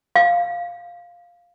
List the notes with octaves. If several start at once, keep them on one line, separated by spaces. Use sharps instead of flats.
F5